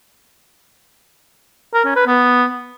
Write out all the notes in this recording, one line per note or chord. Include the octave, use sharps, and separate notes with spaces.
A#4
C#4
B4
B3